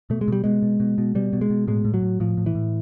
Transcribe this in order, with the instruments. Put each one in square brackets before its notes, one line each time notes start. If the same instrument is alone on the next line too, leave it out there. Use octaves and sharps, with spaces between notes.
[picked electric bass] B2 A3
G#3
B2 G3
B2 G#3
B2
B2
B2
B2 G3
B2
G#3
B2
A2 G#3
A2
F#3
A2
A2 F3
A2
E3
A2